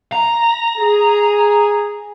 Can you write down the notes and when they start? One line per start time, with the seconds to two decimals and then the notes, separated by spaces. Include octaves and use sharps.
0.12 A#5
0.78 G#4